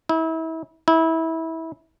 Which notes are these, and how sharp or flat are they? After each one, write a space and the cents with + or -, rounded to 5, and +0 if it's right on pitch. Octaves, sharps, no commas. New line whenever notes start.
E4 -35
E4 -25